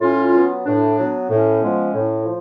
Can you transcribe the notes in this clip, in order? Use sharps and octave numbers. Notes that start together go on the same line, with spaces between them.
A2 C#4 F4
F#3 B3
A2 D4
F#3 B3
A2 C#4
F3 G#3 B3
A2
F3